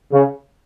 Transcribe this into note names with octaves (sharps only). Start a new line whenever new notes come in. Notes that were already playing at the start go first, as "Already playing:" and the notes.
C#3